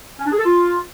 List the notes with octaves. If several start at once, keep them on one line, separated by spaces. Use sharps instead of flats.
C#4
D4
G#4
A4
F4